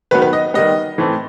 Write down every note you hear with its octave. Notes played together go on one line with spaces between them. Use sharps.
D#3 F#3 B3 B4
B4
D#5
D#3 G3 B3 D#5
A2 E3 A3 C4